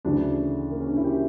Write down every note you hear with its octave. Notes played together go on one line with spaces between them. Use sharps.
D2 C#3 E3 D4
A#3
C#4
D4
E4
G4